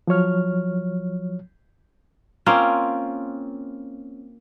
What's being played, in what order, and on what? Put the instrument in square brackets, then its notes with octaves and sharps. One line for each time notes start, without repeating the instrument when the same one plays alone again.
[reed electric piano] F3 F#3 C#5 F6
[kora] A#3 C4 C#4 F4